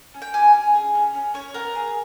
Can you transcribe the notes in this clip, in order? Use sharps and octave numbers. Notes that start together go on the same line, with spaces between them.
C#4
G5
G4 G#5
C#4
G#4
C#4
C#4
C#4 C#5
B3 A#4
G#4